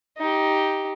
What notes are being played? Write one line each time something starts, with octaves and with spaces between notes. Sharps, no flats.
D#4 G4